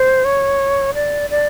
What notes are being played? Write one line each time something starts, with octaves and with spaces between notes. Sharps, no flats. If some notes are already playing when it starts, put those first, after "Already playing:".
Already playing: C5
C#5
D5
D5